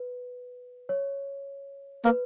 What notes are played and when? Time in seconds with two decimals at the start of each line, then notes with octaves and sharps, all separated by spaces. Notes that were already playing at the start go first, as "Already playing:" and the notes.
Already playing: B4
0.89 C#5
2.05 A#3 B4